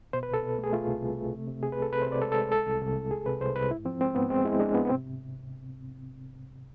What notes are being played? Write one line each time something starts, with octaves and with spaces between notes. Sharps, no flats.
B2 C5
B4
C2 A4
B2
A3
G#4
A3 F4
C2
C2
A3
C3
C3
C3 G#4
B4
C2 A4
C3 B4
C5
C3
D5
G#3 A4
A4
G#3
C2 A4
C2
C2
C2
C2 G#4
C3 B4
C2 C5
C2 B4
G#2 E4
F3 C4
G#3 C4
G#2 B3
G#3 C4
G#3 E4
G#3 D4
G#2 B3
B3
C3 C4